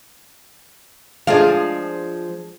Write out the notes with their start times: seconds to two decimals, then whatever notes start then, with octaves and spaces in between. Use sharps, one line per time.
1.27 F3 G#3 D4 G#4 F5